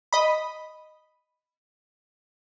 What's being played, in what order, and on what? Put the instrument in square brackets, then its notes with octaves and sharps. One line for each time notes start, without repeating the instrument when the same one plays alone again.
[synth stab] D#5 B5